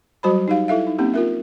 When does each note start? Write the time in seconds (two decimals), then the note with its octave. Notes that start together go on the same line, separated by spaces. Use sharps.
0.23 F#3 G3 F#4 C5 A5 B5
0.48 D#4 G4 F5
0.68 E4 A4 E5 F5
0.87 D#4
0.98 A#3 C4 C#4 D#4 G4
1.14 F4 A#4 E5